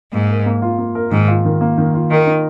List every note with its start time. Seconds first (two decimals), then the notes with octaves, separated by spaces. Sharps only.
0.13 G#2 A#3
0.29 A#4
0.46 A#3
0.62 F4
0.79 A#3
0.95 A#4
1.11 G#2 D#3
1.28 F4
1.45 D#3
1.61 A#3
1.78 D#3
1.94 F4
2.11 D#3 A#4
2.27 D#4